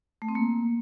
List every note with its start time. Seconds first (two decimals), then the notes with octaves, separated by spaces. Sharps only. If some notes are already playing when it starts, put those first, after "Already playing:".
0.22 A3
0.29 C4
0.35 A#3